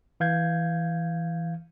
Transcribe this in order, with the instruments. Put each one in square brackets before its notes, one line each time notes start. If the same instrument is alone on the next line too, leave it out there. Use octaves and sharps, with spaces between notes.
[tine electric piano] E3 F5 G6 G#6